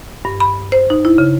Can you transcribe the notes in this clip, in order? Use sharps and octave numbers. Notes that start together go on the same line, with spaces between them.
G2
B5
C5
D#4
E4
C#3